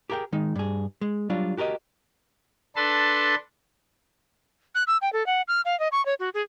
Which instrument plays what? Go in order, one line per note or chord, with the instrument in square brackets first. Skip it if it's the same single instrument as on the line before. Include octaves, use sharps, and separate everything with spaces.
[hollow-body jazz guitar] G4 G#4 A#4 F#5 G5
D#3 G#3 D#4
G2 G#4
G#3
F#3 G3 D4 F4
F#4 G4 A#4 B4 D#5
[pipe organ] D4 A4 B4 A5 C6
[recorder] F#6
E6
G5
A4
F#5
F6
F5
D#5
C#6
C#5
F#4
G#4